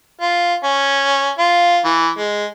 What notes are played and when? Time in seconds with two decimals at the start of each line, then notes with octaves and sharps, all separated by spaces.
0.21 F4
0.64 C#4
1.39 F4
1.85 E3
2.18 G#3